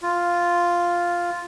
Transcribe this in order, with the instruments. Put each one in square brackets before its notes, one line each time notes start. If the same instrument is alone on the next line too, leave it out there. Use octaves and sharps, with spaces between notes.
[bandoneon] F4